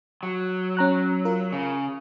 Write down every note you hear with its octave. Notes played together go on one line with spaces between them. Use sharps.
F#3
C#4 A#5 F#6
F4 A#4
C#3